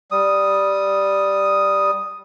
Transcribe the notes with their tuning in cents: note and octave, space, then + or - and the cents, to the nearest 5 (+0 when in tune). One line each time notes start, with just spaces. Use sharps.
G3 +0 D#6 +0